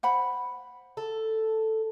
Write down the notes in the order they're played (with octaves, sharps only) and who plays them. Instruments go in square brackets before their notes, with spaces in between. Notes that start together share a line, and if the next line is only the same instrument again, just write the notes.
[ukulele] C5 F#5 B5
[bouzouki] A4